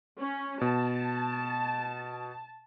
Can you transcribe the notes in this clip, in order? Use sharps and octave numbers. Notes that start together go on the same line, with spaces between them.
C#4
B2 A5